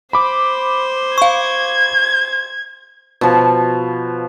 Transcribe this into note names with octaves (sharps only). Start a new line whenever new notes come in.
C5 B5 D6
F5 C#6 G#6
B2 F3